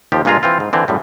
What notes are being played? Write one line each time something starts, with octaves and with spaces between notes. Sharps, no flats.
D#2 F3 G4
G2 A#2 G#3 F4 G#4 A#5
E3 C4 F4
G#2
D3 E3 C4
F#2 A2 G3